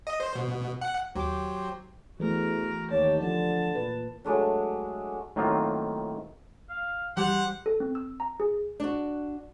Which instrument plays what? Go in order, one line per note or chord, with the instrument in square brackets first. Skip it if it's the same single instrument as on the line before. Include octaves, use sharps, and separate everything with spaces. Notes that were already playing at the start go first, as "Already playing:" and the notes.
[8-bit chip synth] D#5
C5
B2
F#5
[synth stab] D#2 D6 [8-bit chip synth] F#3 [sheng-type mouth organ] G4 C5
[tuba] E2 [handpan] E3 A3 [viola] F#4 A#4
[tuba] D#2 [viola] G4 A5 [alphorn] C#5
[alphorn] D3 [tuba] F3 [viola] A5
[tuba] A#2 [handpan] B4
[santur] F#3 G#3 A3 D4
[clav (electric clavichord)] A2 D#3 F#3 A#3 C4 F4
[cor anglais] F5
[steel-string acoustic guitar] G3 [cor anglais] C5 [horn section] F#5
[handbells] A4
C4
E6
A#5
G#4
[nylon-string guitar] D4 F#4